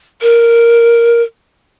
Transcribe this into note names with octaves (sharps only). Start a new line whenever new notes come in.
A#4